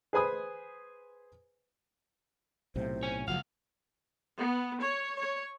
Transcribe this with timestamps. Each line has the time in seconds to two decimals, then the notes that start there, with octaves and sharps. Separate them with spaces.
0.13 G#4 B4 C5 G#5 B5 D#6
2.76 B1 A2 C3 C5
3.03 C#5 G#5
3.28 F#1 C#2 F3 F#3 F5 F#5
4.39 B3
4.80 C#5
5.17 C#5